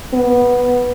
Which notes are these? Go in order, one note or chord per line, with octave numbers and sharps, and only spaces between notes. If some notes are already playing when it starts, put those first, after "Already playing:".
B3